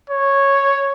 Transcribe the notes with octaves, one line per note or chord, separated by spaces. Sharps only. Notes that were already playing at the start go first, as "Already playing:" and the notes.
C#5